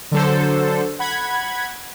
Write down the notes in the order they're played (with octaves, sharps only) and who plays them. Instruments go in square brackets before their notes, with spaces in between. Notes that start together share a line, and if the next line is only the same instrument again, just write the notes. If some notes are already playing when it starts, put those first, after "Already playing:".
[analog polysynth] D3 F#3 A4 C5
F#5 B5 G#6